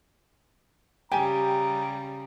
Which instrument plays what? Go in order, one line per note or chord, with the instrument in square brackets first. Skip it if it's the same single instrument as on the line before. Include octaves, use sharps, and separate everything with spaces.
[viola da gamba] C#3 G3 [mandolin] G4 [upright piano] G5 G#5 [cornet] A#5